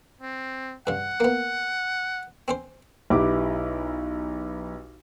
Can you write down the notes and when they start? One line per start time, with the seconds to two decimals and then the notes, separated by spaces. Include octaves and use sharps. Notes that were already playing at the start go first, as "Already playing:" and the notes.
0.21 C4
0.87 G2 C#3 F#5
1.20 A#3 B3
2.48 C4 C#4 C5
3.10 B1 E4 G4 B4 D6